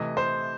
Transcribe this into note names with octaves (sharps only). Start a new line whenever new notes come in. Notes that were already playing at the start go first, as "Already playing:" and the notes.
Already playing: C3 E3 A3 D#5
C5